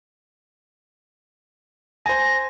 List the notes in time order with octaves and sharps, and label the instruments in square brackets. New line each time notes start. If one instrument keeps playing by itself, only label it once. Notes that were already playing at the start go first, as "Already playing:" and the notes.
[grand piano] C5 G#5 [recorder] A#6